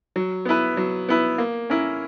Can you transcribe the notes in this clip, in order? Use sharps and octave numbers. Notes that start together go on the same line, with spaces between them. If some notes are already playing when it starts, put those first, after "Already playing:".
F#3
B3 E4 B4
F#3
B3 E4 B4
A#3
C#4 E4 A#4